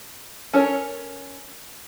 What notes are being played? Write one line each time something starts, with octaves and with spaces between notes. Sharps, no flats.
C#4 A4 A#4 C#5